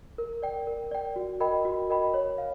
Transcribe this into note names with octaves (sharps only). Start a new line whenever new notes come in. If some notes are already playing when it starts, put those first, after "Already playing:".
A#4
D5 G5
A#4
D5 G5
F#4
A#4 D#5 G5 B5
F#4
A#4 D#5 G5 B5
C#5
F5